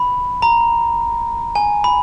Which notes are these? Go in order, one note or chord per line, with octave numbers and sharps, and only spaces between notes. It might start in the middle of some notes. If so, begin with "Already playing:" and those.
Already playing: B5
A#5
G#5
B5